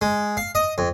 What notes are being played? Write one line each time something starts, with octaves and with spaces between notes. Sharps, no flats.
G#3
F5
D#5
F2